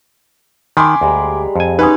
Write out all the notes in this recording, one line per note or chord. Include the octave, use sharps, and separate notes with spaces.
D#3 G#5 B5 C6 D6
D2 G3 G#3 A#5
F2 G#5
B3 C#4 D#4 B4 C6 D#6